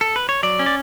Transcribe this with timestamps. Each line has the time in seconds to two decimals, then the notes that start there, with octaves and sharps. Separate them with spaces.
0.01 A4
0.16 B4
0.29 C#5
0.43 F#3 D5
0.59 C#4
0.66 D5